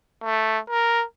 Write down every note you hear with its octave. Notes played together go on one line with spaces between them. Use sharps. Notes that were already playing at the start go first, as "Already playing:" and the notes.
A3
A#4